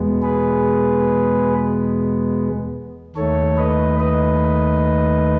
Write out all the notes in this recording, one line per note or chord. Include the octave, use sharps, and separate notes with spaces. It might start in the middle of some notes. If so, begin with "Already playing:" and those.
Already playing: E2 B2 G#3 B3
G#4 B4
D#2 D#3 A3 A4 C#5
B4 D#5
B4 D#5